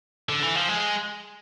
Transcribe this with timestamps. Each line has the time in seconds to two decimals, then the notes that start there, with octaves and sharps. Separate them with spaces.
0.29 D3
0.43 E3
0.56 F3
0.69 G#3